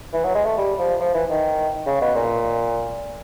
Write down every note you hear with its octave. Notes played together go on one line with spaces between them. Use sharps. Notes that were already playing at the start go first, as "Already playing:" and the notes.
E3
F#3
G#3
A3
G3
F3
F3
E3
D#3
C#3
B2
A#2